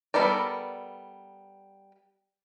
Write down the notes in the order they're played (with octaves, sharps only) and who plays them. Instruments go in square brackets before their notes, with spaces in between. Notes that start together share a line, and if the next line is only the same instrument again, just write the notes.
[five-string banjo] G3 B3 A4 A#4 D5